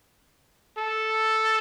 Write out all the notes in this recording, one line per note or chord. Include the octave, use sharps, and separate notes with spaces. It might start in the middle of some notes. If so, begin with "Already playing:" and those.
A4